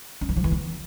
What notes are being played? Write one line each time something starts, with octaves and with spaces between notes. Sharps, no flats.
C#4
E3
F3
E3
B3